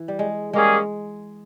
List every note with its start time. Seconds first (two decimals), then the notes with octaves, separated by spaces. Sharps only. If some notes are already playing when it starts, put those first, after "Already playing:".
Already playing: E3
0.08 G3
0.19 G#3
0.53 G3 G#3 A#3 C#4 G#4